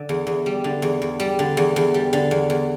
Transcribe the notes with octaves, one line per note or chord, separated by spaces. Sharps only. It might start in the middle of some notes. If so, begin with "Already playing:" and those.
Already playing: D3
E2
E2
G3
D3
E2
E2
G3
D3
E2
E2
G3
D3
E2
E2